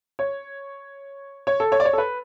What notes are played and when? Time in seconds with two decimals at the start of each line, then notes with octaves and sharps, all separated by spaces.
0.19 C#5
1.47 C#5
1.60 A4
1.72 C#5
1.80 D5
1.85 C#5
1.93 A4
1.98 B4